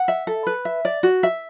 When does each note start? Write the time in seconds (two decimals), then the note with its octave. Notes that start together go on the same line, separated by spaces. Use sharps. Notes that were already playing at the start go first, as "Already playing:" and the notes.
Already playing: F#5
0.08 E5
0.27 A4
0.47 B4
0.65 E5
0.85 D5
1.03 F#4
1.23 E5